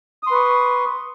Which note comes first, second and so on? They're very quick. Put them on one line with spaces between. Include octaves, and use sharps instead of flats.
D#6 C6 B4 C#6